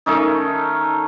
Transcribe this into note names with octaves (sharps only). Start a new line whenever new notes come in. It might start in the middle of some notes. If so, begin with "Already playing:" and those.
D#3 A3 C#4 D#4